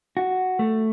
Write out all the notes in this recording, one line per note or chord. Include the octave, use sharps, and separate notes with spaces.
F#4
A3